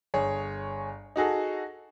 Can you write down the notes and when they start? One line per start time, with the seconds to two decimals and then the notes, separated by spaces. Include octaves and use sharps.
0.14 G1 G#4 C#5
1.16 D#4 F#4 G#4 A4